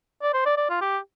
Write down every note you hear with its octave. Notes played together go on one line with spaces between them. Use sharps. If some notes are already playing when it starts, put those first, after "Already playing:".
D5
C5
D5
D5
F4
G4